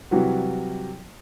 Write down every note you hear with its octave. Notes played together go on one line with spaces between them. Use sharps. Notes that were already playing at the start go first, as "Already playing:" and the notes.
C3 E3 F#3 G3 F#4